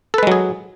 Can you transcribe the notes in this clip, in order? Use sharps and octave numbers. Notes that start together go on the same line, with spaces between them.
F#3 G#3 G#4 A4 B4